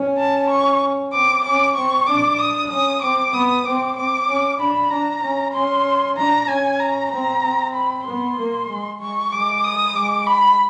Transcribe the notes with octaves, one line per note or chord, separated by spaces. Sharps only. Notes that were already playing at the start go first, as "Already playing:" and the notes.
Already playing: C#4
A5
C#6
C4 D6
C#4 D6
C4 C#6
D4 D6
D#6
C#4 D#6
C4 D6
B3 D#6
C4 D6
C4 D6
C#4
D4 B5
D4 A#5
C#4
C#4 C6
D4 A#5
C#4 G#5
A#5
C4 A#5
C4
B5
B3 C6
A#3
G#3
G#3 C#6
G#3 D6
D#6
G#3 D6
B5